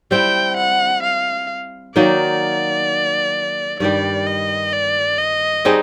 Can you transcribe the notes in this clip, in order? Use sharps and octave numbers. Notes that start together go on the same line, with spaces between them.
G3 C4 E4 G5
F#5
F5
D#3 F#3 A#3 D#4 D5
G2 D#3 G3 D5
D#5
D5
D#5
G3 C4 D#4 G#4